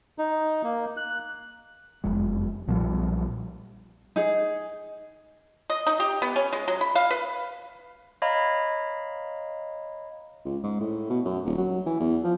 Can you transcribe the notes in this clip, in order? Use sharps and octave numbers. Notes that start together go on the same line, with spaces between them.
D#4
A#3
F#6
F#1 F2 G#3
B1 A#2 F3 G3
D#4 G#4
D#5
D#4
G4
B3
C#4
G#3
F#3
B5
F5
B4
C#5 D#5 F5 A#5 B5
C#2
G#2
A2
B2
F#2
D#1
F#3
E3
E2
F3